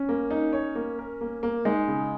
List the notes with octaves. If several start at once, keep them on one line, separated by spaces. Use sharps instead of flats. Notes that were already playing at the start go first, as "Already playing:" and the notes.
Already playing: C#4
A#3
D#4
C#5
A#3
A#4
A#3
A#3
G#3 D#4
C#3